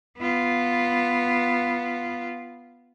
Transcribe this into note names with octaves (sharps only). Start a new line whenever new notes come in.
B3 F4